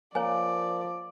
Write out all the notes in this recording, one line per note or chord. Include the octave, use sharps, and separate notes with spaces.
F3 A#3 C#5 D5 G#5